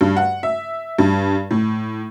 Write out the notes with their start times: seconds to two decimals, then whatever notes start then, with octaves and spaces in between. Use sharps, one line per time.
0.01 G2
0.16 F#5
0.43 E5
0.99 G2
1.51 A2